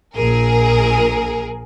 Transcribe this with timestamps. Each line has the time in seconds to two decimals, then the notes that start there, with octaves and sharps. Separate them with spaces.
0.14 A#1 G#4 A#4